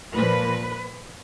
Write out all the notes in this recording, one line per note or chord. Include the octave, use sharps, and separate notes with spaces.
A#2 F3 A#3 B4